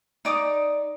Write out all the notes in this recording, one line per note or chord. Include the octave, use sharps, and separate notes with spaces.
D#4 D5 D6 D#6